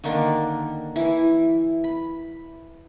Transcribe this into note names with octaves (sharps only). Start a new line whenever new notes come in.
D3 D#3 A#3 D4
E3 E4
B5